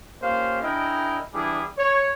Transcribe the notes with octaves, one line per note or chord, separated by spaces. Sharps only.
A#3 C#4 F4 G4 C5 F5
D4 E4 G#4 A#4 D#5 G5
E3 G3 D4 E4 G#4
C#5